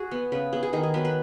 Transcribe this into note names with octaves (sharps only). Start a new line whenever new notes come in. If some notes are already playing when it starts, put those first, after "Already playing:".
Already playing: F#4 G#4
B3
C#3 B4
B3 G#4
G#4
D#3 G#4
G#4
F#3 B3 B4
B4